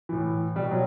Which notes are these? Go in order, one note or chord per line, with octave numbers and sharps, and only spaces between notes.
A2 E3
B2 G3
F#3